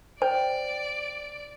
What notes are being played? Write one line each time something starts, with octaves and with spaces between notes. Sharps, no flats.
C5 D5 G5